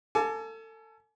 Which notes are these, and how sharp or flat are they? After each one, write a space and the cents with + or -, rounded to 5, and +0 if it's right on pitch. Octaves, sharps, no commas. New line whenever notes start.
A4 +30 G#5 +40 D6 +5